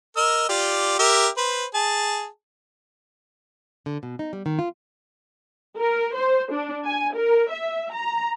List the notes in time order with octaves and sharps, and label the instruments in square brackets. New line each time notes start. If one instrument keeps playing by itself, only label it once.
[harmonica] A#4 D#5 E6
F4 G4 D5
G4 A#4 E5
B4 C5
G#4 A5
[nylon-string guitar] D3
B2
D#4
G3
D#3
F4
[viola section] A#4
C5
D4
G#5
A#4
E5
A#5